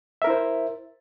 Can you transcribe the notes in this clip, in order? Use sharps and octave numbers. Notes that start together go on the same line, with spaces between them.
E4 A#4 C5 E5